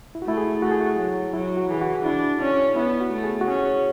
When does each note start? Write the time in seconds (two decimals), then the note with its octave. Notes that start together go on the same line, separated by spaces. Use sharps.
0.15 E4
0.22 F#4
0.26 A3 E4
0.38 G#4
0.62 A3 F#4
0.71 G#4
0.81 F#4
0.98 F#3
1.33 F#3 E4
1.57 F#4
1.69 E3 G#4
1.82 F#4
2.05 D4 E4
2.40 C#4 D4
2.76 B3 E4
3.01 F#4
3.12 A3
3.24 G#4
3.41 F#4
3.48 C#4 G#4